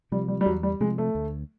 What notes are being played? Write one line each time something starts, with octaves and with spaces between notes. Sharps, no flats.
C3 F3 G3
G3
G3
E2 F#3
G3
C3 F3 G#3
A3
D2